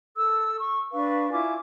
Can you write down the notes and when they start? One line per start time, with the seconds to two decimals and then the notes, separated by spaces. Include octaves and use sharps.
0.15 A4 E6
0.60 C#6
0.92 D4 B4 F5 C#6
1.31 E4 F4 G#5 D6